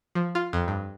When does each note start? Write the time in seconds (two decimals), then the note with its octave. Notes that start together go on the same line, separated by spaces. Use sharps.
0.15 F3
0.35 F4
0.53 F2
0.68 G2